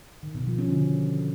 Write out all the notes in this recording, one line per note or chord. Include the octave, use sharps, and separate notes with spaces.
D#3
B2
F3
C#4
D3